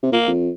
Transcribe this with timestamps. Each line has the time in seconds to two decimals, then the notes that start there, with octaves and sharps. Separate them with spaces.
0.03 C3
0.12 A#2 A#3
0.28 F2